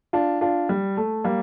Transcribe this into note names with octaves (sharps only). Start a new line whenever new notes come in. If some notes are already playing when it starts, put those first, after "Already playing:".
D4 F4
D4 F4
G3
A3
G3 A#3